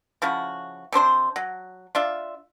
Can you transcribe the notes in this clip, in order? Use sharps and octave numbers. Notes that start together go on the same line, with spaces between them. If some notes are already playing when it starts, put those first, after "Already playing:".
C#3 F3 E4 F#4
C3 D4 C5 C6
F#3
D4 F4 E5